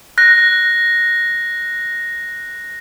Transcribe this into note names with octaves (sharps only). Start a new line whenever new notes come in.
F#6 A#6